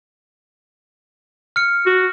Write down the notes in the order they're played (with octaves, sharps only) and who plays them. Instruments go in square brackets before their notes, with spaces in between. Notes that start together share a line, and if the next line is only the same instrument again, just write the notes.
[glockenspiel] F6 C#7
[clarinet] F#4